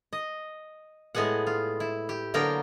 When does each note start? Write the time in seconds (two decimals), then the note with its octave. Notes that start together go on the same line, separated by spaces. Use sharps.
0.13 D#5
1.15 A2 G#3 B3 G#4 F#5
1.47 F4
1.80 E4
2.09 G4
2.34 D3 F#3 A#3 B3 A#4 G5